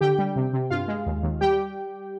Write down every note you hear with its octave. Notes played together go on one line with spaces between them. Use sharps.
D3 G4 G5
G3
C3
C3
G2 F4 F5
G#3
D#2
D#2
G3 G4 G5